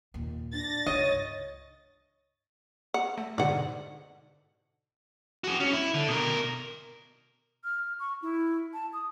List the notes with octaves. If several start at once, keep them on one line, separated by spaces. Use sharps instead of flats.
D#2 A#2
D4 A6 A#6
C#2 G2 C#5 D#5
F#5
A3
G#2 B2 D3 D5 F#5
F#4 G#4
C#4
E4
D3
B2 A#4
F6
C#6
E4
A5
D#6